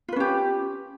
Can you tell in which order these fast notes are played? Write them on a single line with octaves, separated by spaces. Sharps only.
F4 B4 C#4 G4